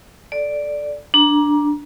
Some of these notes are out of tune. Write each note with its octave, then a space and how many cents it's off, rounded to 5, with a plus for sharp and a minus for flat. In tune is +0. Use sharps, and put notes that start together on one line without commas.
A4 +0 D5 +0
D4 +0 A#5 +20